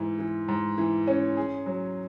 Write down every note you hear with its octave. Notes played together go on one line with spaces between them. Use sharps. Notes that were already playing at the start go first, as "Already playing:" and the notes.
Already playing: G#2 E3
E3
G#2
E3
C#4
G#4
F#3